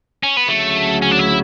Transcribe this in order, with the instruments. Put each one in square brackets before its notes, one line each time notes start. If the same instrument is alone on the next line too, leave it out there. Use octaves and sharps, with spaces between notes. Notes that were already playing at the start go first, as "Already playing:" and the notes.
[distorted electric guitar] C#4
B3
[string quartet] D2 C#3 F#3 [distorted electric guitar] A3
[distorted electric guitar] C#4
D4
E4